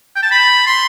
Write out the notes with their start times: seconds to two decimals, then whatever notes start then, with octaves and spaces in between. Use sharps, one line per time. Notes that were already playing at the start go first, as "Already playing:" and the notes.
0.16 G5
0.22 A5
0.31 B5
0.66 C6